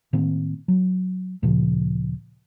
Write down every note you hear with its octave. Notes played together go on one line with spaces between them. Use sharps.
A2 D#3 A#3 C4
F#3
D2 A#2 C#3 F3